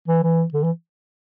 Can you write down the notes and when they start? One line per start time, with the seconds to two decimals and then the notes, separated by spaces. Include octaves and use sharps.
0.08 E3
0.23 E3
0.54 D3
0.64 E3